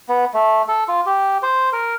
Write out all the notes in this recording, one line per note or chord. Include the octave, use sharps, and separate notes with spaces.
B3
A3
A4
F4
G4
C5
A#4